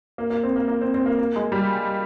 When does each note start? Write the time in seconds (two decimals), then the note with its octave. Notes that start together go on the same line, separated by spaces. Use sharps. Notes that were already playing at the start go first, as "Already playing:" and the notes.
0.18 A#3
0.30 A#3
0.43 C4
0.56 A#3
0.68 A#3
0.81 C4
0.94 C4
1.06 A#3
1.19 A#3
1.36 G#3
1.52 G3